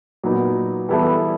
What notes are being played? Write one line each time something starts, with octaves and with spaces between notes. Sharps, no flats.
A#2 F#3 B3 D#4
E3 G3 B3 E4 A4